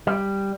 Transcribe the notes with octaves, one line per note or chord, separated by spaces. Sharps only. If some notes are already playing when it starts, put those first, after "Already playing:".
G3